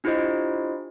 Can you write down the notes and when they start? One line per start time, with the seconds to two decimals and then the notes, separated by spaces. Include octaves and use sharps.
0.04 D4 E4 F4 G4 C5 D#5